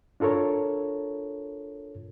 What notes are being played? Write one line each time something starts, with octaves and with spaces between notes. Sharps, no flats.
D4 F4 A4 A#4 C#5